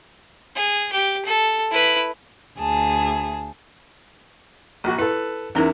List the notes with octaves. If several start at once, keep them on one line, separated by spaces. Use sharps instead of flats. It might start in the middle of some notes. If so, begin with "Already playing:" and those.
G#4
G4
A4
E4 B4
D2 G#4 A5
A#1 A#2 F#4
E4 A4 B4
E2 C#4 D#4 E4 A#4